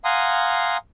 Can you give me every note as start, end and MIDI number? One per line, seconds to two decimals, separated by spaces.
0.05 0.77 77
0.05 0.77 78
0.05 0.77 80
0.05 0.77 82
0.05 0.77 84
0.05 0.77 87